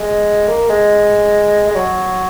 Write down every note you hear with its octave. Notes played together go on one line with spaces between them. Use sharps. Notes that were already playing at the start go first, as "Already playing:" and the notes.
Already playing: G#3
A#3
G#3
G#3
F#3